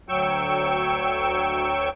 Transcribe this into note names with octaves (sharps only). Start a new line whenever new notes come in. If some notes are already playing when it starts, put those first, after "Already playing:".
D2 F#3 G5 C#6 E6